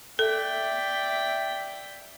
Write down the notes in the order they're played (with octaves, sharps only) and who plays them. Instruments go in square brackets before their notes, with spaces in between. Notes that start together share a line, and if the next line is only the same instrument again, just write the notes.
[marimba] A4 [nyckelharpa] D5 G5 [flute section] E5